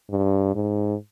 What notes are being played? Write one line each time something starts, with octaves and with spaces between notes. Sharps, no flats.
G2
G#2